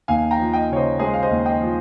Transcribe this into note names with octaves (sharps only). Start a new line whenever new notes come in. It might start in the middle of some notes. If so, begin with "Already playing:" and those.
D#2 F5 G#5
G5 A#5
F3
D#5 G5
C#3 C#5
C5 D#5
G#3 G#4 C5
F5
C5 D#5
D#2
D#5 G5
F3